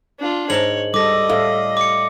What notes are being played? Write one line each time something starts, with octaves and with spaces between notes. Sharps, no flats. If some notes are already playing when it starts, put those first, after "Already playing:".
D4 F4
G#2 A#4 C#5 A5 F#7
G3 A4 D#5 D6 A#6
A2 A4 E5 F5
D6 C#7